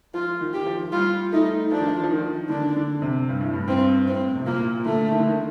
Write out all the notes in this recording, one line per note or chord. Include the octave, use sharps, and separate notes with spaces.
F3 F4
D#3
G4
F3
G3 F4
A3 D#4
F3 D4
D#3
F3
F3
D#3
D3 D4
D3
C3
G2
A2
G2
G2 C4
A2 C4
C3
A#2 A#3
D3 A3
D#3
D3
D#3